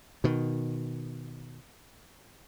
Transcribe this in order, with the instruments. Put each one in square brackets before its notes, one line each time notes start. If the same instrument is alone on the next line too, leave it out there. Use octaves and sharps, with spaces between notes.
[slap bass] B2 D#3